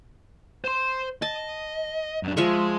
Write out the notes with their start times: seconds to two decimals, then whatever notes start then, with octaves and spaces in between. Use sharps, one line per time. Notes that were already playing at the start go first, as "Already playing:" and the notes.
0.64 C5 C6
1.22 D#5 A5
2.23 F#2 D4
2.37 F3 G#3 E5 C#6